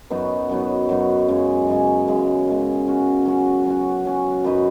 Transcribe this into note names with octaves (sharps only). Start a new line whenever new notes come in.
F#2 F#3 B3 D#4
F#2 F#3 B3 D#4
F#2 F#3 B3 D#4
F#2 C#3 G#3
F#2 C#3 G#3
F#2 C#3 G#3
F#2 C#3 G#3
F#3 C#4 F#4
F#3 C#4 F#4
F#3 C#4 F#4
F#3 C#4 F#4
F#2 F#3 D#4 B4